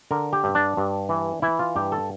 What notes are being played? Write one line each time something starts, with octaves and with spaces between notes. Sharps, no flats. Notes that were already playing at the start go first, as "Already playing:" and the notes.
D3 A#4
G4
G2
D4
G2
E3
E3 E4
F4
G2 G4
A4